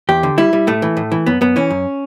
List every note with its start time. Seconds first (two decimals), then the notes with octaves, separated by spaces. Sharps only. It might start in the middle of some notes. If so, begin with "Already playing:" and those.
0.09 E2 G4
0.23 D3
0.38 G3 E4
0.53 G3
0.67 A2 A3
0.82 E3
0.97 A2
1.12 E3
1.26 F#2 B3
1.41 F#2 B3
1.56 E3 C#4
1.71 F#2